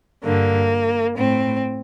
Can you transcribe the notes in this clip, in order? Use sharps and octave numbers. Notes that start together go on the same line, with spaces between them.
G2 D3 A#3
A2 C4